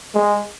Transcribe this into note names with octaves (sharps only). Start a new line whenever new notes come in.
G#3